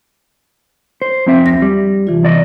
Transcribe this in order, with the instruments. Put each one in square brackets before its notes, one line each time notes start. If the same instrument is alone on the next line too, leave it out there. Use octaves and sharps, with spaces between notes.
[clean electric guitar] C5
F2 C4 E5
[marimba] D2 A#6
[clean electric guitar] G3
[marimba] C3 E3 F4
[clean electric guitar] E2 D5 D#5